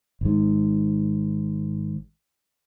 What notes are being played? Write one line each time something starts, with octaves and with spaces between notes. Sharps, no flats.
G#1 G#2